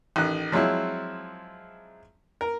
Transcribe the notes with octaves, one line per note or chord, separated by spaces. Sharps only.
A1 D#3 F#6
F3 F#3 G#3 C4 E4
A#4